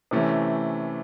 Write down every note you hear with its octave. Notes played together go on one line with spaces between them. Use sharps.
C3 E3 A3 C#4